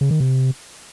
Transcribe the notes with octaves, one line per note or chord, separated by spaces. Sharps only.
C#3
D#3
C3